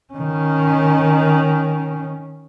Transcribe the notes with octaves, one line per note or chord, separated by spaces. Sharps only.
D#3 C#4